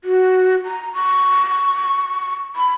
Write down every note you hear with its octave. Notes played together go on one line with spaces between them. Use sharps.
F#4
A#5
C#6
B5